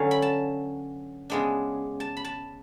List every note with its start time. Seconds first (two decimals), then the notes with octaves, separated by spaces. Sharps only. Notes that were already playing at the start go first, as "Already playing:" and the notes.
Already playing: D3 F#3 C#4 A4 B4 F5
0.11 B5
0.22 A5
1.30 C#3 G#3 B3 D4
2.00 A5
2.17 B5
2.24 A5